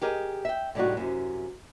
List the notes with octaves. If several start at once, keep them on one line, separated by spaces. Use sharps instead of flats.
G4 G#4 A#4 D#5
E5 G5
A2 C3 G3 D4 D#4 F#4
F#2 C3